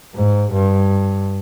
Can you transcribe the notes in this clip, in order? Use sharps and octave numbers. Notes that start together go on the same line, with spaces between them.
G#2
G2